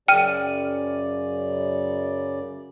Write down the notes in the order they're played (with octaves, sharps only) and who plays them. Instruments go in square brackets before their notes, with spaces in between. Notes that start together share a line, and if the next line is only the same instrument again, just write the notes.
[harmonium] F#2 C#3 D5 [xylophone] G5 F6 D#7